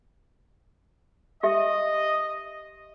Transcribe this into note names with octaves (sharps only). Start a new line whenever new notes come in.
G4 D#5 E5